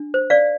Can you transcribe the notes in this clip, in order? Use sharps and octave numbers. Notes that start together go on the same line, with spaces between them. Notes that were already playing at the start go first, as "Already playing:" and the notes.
Already playing: D4
C5
D5 F5